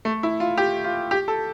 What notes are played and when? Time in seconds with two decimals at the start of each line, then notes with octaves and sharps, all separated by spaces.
0.05 A3
0.23 E4
0.40 F4
0.58 G4
0.84 F4
1.11 G4
1.28 A4